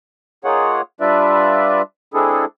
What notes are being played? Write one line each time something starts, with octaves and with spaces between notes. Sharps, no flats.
A#3 D#4 F4 G#4 C#5 F#5
G3 D4 F4 B4 D5 E5
G#3 C4 D4 E4 G#4 A4